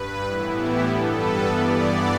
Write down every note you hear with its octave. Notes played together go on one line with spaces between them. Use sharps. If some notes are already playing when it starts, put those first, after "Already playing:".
Already playing: G2 B4
A2 E3 B3 E4
G4
G2 G3 B3 A4
B4
G2 E3 B3 D5